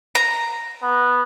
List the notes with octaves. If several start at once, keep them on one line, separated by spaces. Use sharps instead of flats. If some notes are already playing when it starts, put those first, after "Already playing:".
A#5
B3